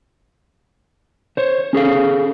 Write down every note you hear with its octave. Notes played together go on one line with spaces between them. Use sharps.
C5 C#5
C#4 G#4 A4 F5